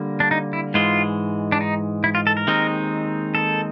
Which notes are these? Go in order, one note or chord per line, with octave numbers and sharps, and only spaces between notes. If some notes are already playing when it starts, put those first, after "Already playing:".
Already playing: D3 G3 A#3
D4
D#4
E4
G#2 E3 G#3 F4
D4
D#4
E4
F4
A4
A#4
D#2 D#3 G#3 C4 D#4
A4